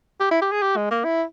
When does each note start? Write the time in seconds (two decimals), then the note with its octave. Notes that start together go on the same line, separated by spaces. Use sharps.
0.20 G4
0.31 E4
0.42 G4
0.52 G#4
0.62 G4
0.77 G#3
0.91 A#3
1.04 E4